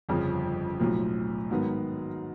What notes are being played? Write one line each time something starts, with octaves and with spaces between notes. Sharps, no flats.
G1 F2 C#3 F3
B1 A2 F3
G#2 D#3 F#3 B3